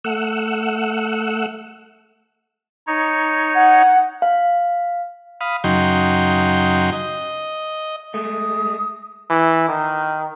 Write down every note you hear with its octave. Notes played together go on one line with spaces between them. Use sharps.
A3 F#5 E6
D#4 C#5
F#5
F5
F5 B5 D#6
F#2 C#3 F#3 D#4 G5 C6
D#5
G#3 A3 D#6
E3
D#3